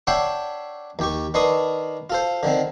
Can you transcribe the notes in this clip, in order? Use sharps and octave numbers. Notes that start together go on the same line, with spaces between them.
D4 C#5 E5 F#5 G5 C6
D#2 G4 C#6
D#3 D4 B4 C6 C#6 D#6
F4 A4 C5
D3 D#3 C4